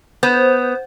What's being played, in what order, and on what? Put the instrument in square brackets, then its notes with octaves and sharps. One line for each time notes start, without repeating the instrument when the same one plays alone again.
[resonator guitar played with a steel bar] B3 [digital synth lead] C5